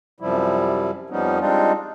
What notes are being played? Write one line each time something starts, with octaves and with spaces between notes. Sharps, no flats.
F#2 C3 F3 G3 E4
F2 F3 G3 B3 C#4 D#4
G3 G#3 C4 D4 D#4 F4